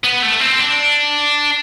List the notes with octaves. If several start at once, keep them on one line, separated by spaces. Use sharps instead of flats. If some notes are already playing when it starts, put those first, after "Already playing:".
B3
A3
C4
D4